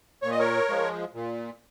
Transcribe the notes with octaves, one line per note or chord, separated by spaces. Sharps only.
A#2 C#5
D#5
A#4 C#5
F3 G#3
A#2